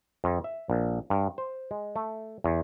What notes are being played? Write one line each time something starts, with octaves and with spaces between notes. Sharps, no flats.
F2
E5
A#1
G2
C5
G#3
A3
E2